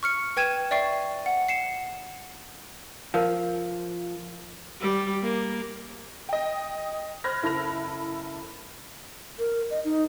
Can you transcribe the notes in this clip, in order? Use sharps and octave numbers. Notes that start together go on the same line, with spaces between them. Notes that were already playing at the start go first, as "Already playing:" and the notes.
C#6 F6 C#7
B4 G5 G#6 D#7 E7
D5 E5 G5 C#6 C7
F#5
C7 C#7 E7
F3 A#4 F5
G3
A#3
D#5 G5
C5 B5 F6 F#6 G#6 A#6
F#1 E4 A4 B5 A#6 F7
A#4
D#5
D#4